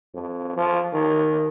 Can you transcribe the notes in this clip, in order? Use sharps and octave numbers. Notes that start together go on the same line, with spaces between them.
F2
F3
D#3